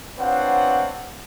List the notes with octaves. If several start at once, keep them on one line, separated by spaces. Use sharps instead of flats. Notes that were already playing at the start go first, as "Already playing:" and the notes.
C4 D4 F4 B4 C#5 F#5